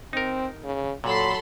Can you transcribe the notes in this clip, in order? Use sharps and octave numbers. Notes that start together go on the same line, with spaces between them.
C4 D#4 A#4
C#3
A#2 F#3 A4 B5 C6